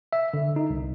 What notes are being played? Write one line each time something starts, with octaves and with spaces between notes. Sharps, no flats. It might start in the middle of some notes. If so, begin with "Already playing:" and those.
E5
D3
D#4
C2